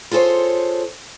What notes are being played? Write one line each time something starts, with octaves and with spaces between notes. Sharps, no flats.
F4 G#4 A4 C5 C#5